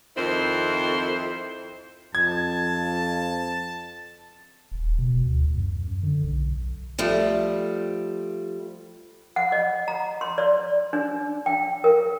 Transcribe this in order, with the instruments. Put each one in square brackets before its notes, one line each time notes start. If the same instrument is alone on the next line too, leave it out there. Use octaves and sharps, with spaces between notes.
[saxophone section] F2 D#3 C4 E4 C5
[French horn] F2 [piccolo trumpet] A5 [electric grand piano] G#6
[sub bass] D#1
B2
D2
F#2
D3
B1
[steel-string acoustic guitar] F3 G3 A3
[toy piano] F#5
D#5
A#5
C6
D5
D4
G5
A#4